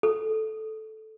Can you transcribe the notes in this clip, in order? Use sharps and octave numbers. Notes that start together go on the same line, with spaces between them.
A4